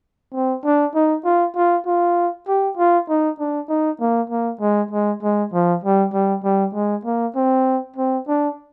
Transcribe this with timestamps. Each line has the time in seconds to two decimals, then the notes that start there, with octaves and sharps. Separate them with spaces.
0.34 C4
0.65 D4
0.95 D#4
1.25 F4
1.56 F4
1.86 F4
2.48 G4
2.77 F4
3.09 D#4
3.39 D4
3.69 D#4
4.00 A#3
4.30 A#3
4.61 G#3
4.91 G#3
5.23 G#3
5.53 F3
5.84 G3
6.13 G3
6.44 G3
6.74 G#3
7.05 A#3
7.35 C4
7.96 C4
8.28 D4